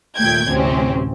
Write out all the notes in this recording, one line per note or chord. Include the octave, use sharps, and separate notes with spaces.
D#2 A#2 A3 G5 G6 G#6
A1 D2 C3 C4 C#4